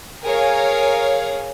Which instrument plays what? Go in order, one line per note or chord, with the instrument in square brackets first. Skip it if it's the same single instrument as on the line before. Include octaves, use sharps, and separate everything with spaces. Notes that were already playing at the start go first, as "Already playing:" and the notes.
[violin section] G#4 A#4 C#5 F5